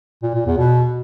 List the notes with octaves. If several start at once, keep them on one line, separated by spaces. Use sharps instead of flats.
A#2
A#2
E2
B2